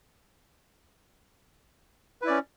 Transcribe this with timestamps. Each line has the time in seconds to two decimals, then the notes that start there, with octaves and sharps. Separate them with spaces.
2.22 B4
2.24 E4
2.27 D5
2.30 C#4